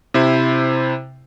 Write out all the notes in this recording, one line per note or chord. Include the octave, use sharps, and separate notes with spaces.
C3 E4 C5